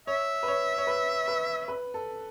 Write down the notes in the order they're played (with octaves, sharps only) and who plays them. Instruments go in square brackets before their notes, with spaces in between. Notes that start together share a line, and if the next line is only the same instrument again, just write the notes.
[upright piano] C#5 [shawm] E5
[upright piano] B4
C#5
C#5
B4
B4
B4
A4